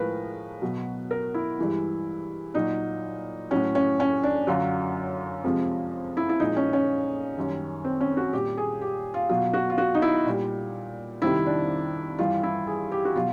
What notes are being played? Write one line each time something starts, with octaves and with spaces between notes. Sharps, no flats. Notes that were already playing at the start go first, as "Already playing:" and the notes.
Already playing: A2 F3 G#3 A#4 B4
B2 F#3
A#4
E4
G2 E3 G#3
A#2 F#3 D#4
A2 F#3 C#4
C#4
C#4
D4
F#2 D3 F#3 F4
F2 C3 F3 G#3
E4
E4
A#2 F3 G#3 D#4
C#4
C#4
F#2 D#3 G3
C4
C#4
F#4
A#2 G3 G4
G#4
G4
F4
B2 F#3 F4
F#4
F4
F#4
D#4
E4
A#2 G3
F2 C3 D#3 G3 E4
D4
G2 E3 G3 F4
E4
G#4
G4
F#4
B2 F#3 F4